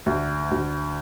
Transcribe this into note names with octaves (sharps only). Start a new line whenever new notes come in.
D2
D2